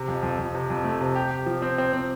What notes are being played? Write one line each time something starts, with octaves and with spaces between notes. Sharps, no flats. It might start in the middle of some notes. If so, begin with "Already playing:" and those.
Already playing: C3
F2
F2
F2
C3
F2
A3
C3
G4
G4
F3
C4
C4
C4